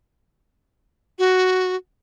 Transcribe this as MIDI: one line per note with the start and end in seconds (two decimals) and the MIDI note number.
1.19 1.76 66